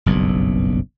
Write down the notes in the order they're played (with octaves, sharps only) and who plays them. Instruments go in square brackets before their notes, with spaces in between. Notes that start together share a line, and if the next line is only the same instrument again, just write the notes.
[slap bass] F#1 B1 G2